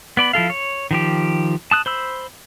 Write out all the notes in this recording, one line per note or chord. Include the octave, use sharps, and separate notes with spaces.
B3 D5 B5
F3 E4 A4 F5
C#5
D#3 F3 G4
A5 D#6 F#6
C5 B5 E6